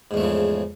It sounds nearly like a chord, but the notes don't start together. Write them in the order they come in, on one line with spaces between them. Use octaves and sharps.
G#2 E2 A3 F3 C#3